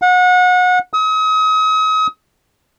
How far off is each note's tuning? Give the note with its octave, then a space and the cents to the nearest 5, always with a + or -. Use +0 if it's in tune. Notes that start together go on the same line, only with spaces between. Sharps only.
F#5 -30
D#6 +40